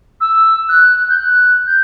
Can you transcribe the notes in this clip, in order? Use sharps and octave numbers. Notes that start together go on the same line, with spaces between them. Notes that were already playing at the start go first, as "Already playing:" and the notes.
E6
F#6
G6
F#6
G6